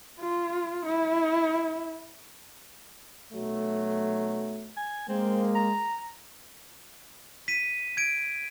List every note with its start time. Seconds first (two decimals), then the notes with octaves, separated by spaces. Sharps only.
0.20 F4
0.86 E4
3.33 B1 F#3 A3
4.77 G#5
5.09 G#3 A#3 C4
5.55 A#5
7.48 B6 D#7
7.97 G#6 D7